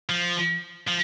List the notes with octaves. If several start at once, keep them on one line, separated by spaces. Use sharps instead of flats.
F3
F3